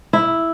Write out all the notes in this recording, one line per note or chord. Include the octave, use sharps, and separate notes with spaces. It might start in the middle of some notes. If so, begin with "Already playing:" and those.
E4